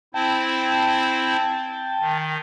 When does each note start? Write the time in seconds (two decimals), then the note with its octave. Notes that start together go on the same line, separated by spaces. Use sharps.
0.14 C4 E4 C5 G5 A5
2.01 D#3